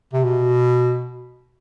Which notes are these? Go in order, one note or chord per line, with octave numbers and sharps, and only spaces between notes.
C3
B2